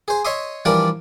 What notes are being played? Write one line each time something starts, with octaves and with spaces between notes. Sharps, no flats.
G#4 C5
C#5 D#5 E5 C6 D#6
E3 F3 G3 D4 A#4 D6